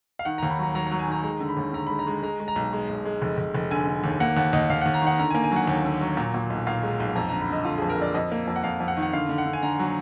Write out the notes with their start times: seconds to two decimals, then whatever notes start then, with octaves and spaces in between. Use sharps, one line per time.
0.19 F5
0.25 D#3 F#5
0.38 D#2 A#5
0.50 B5
0.59 F#3 A#5
0.75 F#3 A#5
0.87 F#3 A#5
0.99 G#5
1.08 D#3 A#5
1.24 G#3 A#5
1.41 D3
1.48 B5
1.57 D#2
1.73 D3 A#5
1.87 G#3 B5
1.99 A#5
2.07 G#3
2.23 G#3 A#5
2.40 G#3
2.48 A#5
2.56 B1
2.73 G#3
2.89 B1
3.05 G#3
3.22 F1
3.37 F1
3.54 F1
3.71 D3 G#5
3.87 D3
4.04 D#2
4.20 A#3 F#5
4.37 D#2 F#5
4.53 D#2 D#5
4.70 D#2 F5
4.81 D#2 F#5
4.94 A#5
5.02 D#3 F#5
5.19 D3 A#5
5.31 A#3 G#5
5.44 G#5
5.52 F#3 F#5
5.68 D#2
5.85 D3
6.01 F#3
6.17 A#2
6.34 A#2
6.50 B1
6.67 A#2 F5
6.83 G#3
7.00 B1
7.15 F2 A#5
7.29 D3 A#5
7.41 B5
7.49 D3 D#5
7.65 D3 F4
7.78 F2 G#4
7.89 A#4
7.98 F2 D5
8.14 F2 D#5
8.32 A#3
8.48 F2
8.56 F#5
8.64 F2 F5
8.80 F2
8.88 F#5
8.97 D#3
9.03 F#5
9.13 D3 F5
9.29 D3
9.38 F#5
9.46 D3
9.53 G#5
9.63 D3 A#5
9.79 F#3